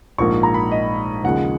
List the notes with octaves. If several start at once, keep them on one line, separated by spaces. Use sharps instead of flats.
A#1 G#2 F3 A#3 C#6
A#5
B5
D#5
D#2 C#3 F3 G#3 F#5